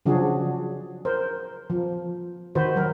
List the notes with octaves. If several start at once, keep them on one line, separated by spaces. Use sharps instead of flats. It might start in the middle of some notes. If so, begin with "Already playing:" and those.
C#3 F3 F#3 D4 F#4 G#4
A#4 C5
F3
D#3 F#4 B4 C5
F#3 A#4